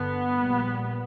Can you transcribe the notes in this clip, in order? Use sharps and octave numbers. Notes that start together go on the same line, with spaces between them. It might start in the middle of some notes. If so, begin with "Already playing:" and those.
Already playing: G1 G2 D3 B3
A#1 A#2 G3